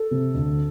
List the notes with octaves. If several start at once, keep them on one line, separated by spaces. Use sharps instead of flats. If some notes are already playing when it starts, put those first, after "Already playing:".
Already playing: A4
C3
D2